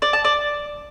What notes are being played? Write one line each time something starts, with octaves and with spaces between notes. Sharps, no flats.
D5
A5
D5